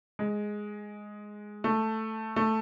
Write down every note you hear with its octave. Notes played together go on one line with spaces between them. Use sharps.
G#3
A3
A3